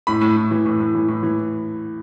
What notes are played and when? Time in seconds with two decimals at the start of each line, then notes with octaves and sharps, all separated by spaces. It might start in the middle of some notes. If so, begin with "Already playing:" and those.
0.07 A2 B5
0.21 A2
0.36 A2
0.51 E3
0.66 A2
0.80 A2
0.95 E3
1.08 A2
1.23 E3